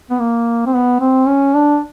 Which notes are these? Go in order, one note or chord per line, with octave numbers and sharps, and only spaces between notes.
B3
A#3
C4
B3
C4
C#4
D4